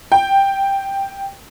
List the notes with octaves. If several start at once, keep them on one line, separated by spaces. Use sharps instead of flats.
G5